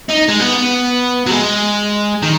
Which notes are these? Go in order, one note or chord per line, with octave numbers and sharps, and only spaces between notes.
D#4
G#3
B3
F#3
G#3
D#3